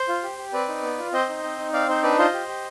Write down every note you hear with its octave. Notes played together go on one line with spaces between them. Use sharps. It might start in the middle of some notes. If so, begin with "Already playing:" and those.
Already playing: C5
F4
G4
G4
C4 B4 D5
D#4
B3
F4
C4 C5 D#5
D#4
C4
D#4
C4 D5 F5
D#4 C5
D4 B4 D5
F4 C5 D#5
G4
G4